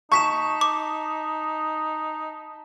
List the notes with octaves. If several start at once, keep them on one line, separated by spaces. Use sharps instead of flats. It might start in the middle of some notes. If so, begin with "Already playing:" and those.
D#4 A5 C#6 B6 E7
D6